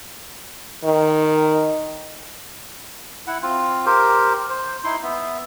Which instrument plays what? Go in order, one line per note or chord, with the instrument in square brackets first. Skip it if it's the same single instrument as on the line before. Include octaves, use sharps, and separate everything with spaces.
[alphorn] D#3
[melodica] E4 F#5
C4 F4
G4 A#4 C5
C5
D#4 E4 C6
B3 E5